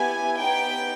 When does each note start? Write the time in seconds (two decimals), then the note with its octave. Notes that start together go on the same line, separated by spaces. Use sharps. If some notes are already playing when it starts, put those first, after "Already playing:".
Already playing: B3 E4 G4 G#5
0.39 B3 D#4 G4 G5